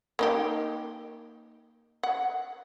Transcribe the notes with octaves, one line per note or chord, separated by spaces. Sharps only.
A#3 D#4 G4
F#5